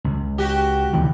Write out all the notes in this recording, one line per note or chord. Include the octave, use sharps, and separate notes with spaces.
C#2
F#4 G4
D2 C3 E3